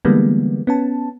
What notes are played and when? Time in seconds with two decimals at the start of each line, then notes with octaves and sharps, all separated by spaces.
0.05 D3 E3 G3 G#3 A#3 B3
0.67 B3 C#4 A5